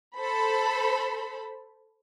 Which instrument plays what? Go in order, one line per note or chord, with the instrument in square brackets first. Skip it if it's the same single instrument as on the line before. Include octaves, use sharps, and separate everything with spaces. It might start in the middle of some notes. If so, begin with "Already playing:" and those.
[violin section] A4 C5 B5